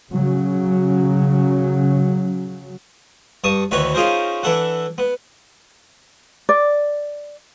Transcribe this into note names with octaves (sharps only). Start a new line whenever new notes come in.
C#3 F#3
G2 A5 C#6 D#6
D2 D#3 E3 B4 C#5
C#4 D#4 F4 G#4 A#4 C5
E3 D4 E4 A4 F#5
B3
D5